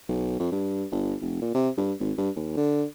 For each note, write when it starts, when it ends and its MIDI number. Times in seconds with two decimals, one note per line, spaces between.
0.09 0.39 35
0.39 0.50 41
0.52 0.85 43
0.91 1.15 31
1.21 1.38 29
1.42 1.51 46
1.54 1.69 48
1.77 1.93 43
2.00 2.13 32
2.18 2.30 43
2.36 2.52 39
2.57 2.85 50